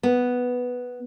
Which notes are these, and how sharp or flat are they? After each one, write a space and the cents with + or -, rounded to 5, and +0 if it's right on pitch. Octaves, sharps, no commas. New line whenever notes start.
B3 +0